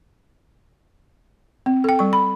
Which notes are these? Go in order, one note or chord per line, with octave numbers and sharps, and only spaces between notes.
C4
A4 G5
G3 C#6
B5